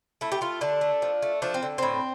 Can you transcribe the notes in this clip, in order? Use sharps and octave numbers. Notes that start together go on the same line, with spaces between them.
A3 E4
G4
A3 F4
D3 D4
A3
F3
A3
F3 D4
C4
D3
A2 C4